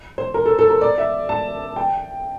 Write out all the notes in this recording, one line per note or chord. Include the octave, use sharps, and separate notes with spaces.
C5
A#4
A4
A4
A#4
D5
E5
A5
G5